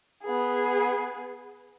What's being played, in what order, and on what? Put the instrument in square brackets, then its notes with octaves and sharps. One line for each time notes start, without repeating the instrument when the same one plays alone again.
[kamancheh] B3 G#4